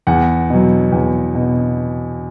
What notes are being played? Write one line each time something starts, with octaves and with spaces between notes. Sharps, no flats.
E2 F#5
B2 F#3
E2
B2